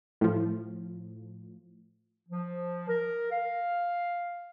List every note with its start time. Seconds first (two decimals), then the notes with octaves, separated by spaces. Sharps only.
0.21 A2 F3
2.28 F3
2.87 A#4
3.31 F5